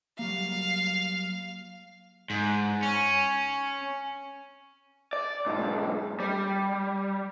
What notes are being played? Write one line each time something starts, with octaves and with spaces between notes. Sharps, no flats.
F#3 G3 A#3 F5
G#2
C#4
D5
B1 G#2
G3